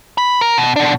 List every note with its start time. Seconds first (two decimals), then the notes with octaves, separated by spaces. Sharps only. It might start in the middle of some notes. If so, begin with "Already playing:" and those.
0.18 B5
0.41 A#4
0.58 B2
0.76 B2 D4